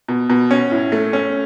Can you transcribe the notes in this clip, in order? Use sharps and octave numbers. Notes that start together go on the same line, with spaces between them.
B2
B2
C#4
A2
A3
C#4